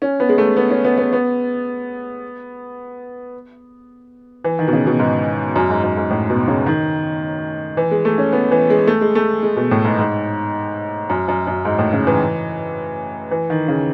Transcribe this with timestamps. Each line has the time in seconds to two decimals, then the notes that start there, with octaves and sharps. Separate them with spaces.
0.02 C#4
0.20 B3
0.29 G#3
0.38 A3
0.57 B3
0.70 C#4
0.85 B3
0.98 B3
1.13 B3
4.44 E3
4.59 D#3
4.68 B2
4.73 C#3
4.87 B2
4.99 G#2
5.56 F#2
5.70 G#2
5.84 F#2
5.97 G#2
6.11 A2
6.30 B2
6.48 C#3
6.66 D#3
7.77 E3
7.91 G#3
8.05 A3
8.18 C#4
8.32 B3
8.51 E3
8.70 G#3
8.87 A3
9.01 G#3
9.15 A3
9.43 G#3
9.57 B2
9.71 A2
9.85 G#2
9.99 G#2
11.10 F#2
11.28 F#2
11.47 F#2
11.65 G#2
11.79 A2
11.93 C#3
12.07 E3
13.31 E3
13.50 D#3
13.68 C#3